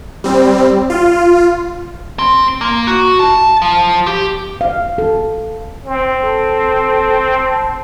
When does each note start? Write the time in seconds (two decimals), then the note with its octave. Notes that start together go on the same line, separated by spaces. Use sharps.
0.24 G3 C4
0.90 F4
2.19 C4
2.61 A#3
2.87 F#4
3.19 A5
3.62 F3
4.07 G4
4.61 F5
4.98 A4
5.86 C4
6.24 A4
7.47 A5